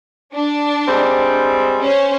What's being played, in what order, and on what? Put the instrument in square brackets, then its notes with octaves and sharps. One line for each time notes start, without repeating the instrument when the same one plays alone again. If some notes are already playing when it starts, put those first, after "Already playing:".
[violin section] D4
[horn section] G3 G#3 C4
[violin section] C#4 C5